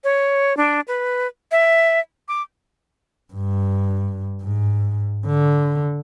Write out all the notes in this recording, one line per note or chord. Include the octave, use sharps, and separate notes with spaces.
C#5
D4
B4
E5
D6
G2
G#2
D3